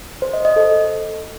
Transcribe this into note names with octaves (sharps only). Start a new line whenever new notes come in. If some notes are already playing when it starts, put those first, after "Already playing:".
C5
D#5
D#5
A4